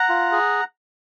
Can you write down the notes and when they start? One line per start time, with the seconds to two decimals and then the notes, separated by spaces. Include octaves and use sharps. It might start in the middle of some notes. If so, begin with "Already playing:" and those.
Already playing: F#5 A#5
0.09 F4
0.32 G#4